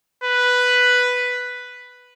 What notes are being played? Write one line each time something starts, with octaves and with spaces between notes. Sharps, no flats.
B4